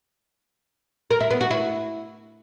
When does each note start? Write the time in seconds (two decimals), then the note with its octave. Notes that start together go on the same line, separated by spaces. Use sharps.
1.11 A#4
1.21 E4
1.31 B3
1.41 F#4
1.51 E4